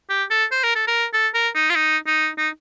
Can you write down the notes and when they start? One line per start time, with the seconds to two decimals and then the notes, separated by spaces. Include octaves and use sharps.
0.09 G4
0.30 A4
0.51 C5
0.63 A#4
0.75 A4
0.87 A#4
1.13 A4
1.34 A#4
1.55 D#4
1.70 F4
1.75 D#4
2.07 D#4
2.38 D#4